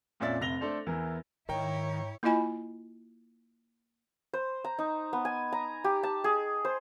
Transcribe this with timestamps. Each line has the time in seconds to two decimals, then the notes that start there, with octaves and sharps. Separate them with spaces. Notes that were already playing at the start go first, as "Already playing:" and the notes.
0.20 F2 A#2 C#4 D5 E5 A6
0.40 F1 C3 A#6 F7 G7
0.60 A3 D4 A4 C5 D5
0.86 E2 E3 A#4
1.49 G#2 D#3 E4 C#5 G5 A#5
2.23 A#3 E4 F4 D#5 G#5 B5
4.33 C5
4.65 A#5
4.79 D#4
5.13 B3
5.25 G#5
5.52 A#5
5.84 G4
6.03 A5
6.24 G#4
6.65 C5